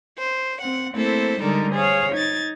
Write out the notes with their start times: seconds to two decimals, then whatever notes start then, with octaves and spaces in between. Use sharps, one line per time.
0.19 C5
0.62 C4 F#5
0.94 A3 A#3 C4 E4 A4 C5
1.41 D3 G3 G#3 D#4 A4 A#4
1.73 G#4 C5 C#5 F5
2.13 D#4 G#6 A6